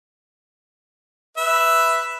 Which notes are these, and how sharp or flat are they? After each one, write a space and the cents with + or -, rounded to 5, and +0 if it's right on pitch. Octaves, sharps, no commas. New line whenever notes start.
B4 +0 E5 +0